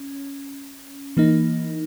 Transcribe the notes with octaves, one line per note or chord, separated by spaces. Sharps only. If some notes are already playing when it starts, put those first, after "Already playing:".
Already playing: C#4
E3 A#3 D#4